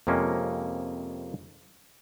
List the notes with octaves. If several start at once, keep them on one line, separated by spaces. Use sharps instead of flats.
F2 C3 G#3 A#3 C#4